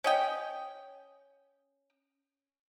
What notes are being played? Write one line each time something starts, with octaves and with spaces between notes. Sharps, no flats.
C#4 D#5 G5